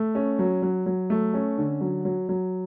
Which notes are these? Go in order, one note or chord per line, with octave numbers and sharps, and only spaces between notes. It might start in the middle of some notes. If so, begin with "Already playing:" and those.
Already playing: A3
C#4
F#3
F#3
F#3
A3
C#4
D3
F#3
F#3
F#3